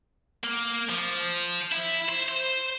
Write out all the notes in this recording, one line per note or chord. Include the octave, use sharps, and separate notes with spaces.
A#3
F3
E4
C5
C5